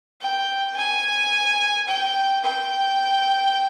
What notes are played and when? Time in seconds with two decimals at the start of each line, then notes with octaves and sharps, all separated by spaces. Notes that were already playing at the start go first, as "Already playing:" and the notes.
0.21 G5
0.77 G#5
1.88 G5
2.44 G5